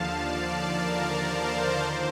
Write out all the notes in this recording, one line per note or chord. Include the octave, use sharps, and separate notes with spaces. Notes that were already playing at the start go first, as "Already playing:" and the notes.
Already playing: D#2 D3 F3 F5 A5
D5 F5
A#4
C5
D#2